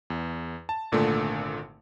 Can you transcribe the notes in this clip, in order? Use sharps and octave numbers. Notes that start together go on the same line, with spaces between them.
E2
A5
G#1 A#2 D3 A3